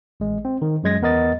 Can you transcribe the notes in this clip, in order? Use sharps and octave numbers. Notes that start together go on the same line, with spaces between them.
A1 G#3
C4
D#3
F#2 F#3 G#3 G#6 A#6
E2 B3 A#4 D#5 A6